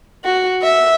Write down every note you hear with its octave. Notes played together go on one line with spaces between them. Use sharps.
F#4
E5